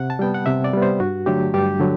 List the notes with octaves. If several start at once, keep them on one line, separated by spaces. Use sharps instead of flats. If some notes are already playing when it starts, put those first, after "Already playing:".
Already playing: C3 F#5
A5
G3 B3 G5
F#5
C3 E5
D5
G3 B3
C5
G2 F#4
D3 F#3 A3 G4
G2 G4
D3 F#3